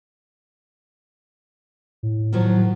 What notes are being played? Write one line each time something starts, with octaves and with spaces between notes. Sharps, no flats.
A2
D#3 F3 F#3